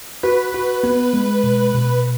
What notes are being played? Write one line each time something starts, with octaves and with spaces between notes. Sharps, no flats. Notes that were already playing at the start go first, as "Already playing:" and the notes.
F#4 B4
F#4
B3
G#3
B2
B2